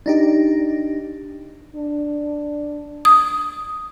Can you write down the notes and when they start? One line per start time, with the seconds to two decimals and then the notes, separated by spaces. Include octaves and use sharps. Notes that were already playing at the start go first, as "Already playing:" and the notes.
0.06 D4 D#4 G4
1.76 D4
3.05 D#6